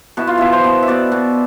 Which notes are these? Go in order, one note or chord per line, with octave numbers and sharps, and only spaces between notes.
B2 E4
F4
B2 E4
C5
B2
E5
B2 D5
B2